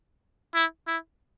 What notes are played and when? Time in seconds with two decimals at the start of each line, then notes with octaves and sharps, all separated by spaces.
0.55 E4
0.87 E4